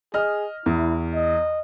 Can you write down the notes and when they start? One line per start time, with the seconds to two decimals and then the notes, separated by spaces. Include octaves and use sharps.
0.14 G#4 D#5 F6
0.66 E2 E4
1.14 D#5